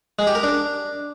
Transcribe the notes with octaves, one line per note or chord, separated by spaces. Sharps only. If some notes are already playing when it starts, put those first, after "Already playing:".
G#3
G4
A#4
D4